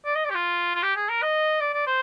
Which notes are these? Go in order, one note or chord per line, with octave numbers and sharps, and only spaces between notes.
D5
D#5
D5
G4
F4
F4
G4
G#4
A#4
D#5
D5
D5
C5